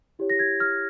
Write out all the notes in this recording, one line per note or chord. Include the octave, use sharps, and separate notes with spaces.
E4 G4 C#5
A#6
G#6
F6